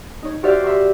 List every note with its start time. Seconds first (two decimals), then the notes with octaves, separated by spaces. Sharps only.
0.22 D#4 C#5
0.43 F#4 G4 C5 D5 E5 F5
0.64 E5 A#5 C6 C#6